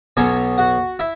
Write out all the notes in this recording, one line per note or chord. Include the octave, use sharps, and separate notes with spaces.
B1 B2 F#3 C#4 C#5
F#4 F#5
E4 E5